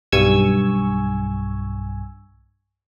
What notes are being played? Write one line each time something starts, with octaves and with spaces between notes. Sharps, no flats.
B1 G2 G#5 C#6 E6 G#6